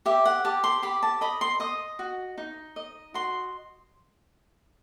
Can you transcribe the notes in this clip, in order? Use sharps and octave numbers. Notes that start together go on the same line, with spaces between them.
G4 E5
F#5
G4 A5
C6
G4 B5
A5
D#5 B5
C6
D#5 D#6
F#4
D#4
D#5
F#4 C6